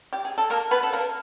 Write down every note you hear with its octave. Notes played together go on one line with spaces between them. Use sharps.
G4
G#4
A4
A#3 A#4
B3 B4
A4
A#3 A#4